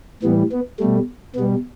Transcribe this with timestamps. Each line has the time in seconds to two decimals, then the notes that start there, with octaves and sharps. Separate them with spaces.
0.23 A2 E3 G3 B3
0.52 B3
0.79 B2 G3 A3
1.35 B2 G3 B3